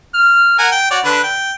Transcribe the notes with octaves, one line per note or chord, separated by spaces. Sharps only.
F6
A#4 F#5 G#5
G5
F#4 C#5 D5
D3 D4 B4
G5